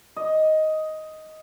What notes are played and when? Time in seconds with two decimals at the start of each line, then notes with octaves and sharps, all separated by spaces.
0.17 D#5